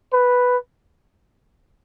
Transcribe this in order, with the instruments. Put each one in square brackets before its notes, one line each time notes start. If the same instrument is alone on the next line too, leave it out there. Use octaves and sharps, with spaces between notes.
[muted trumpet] B4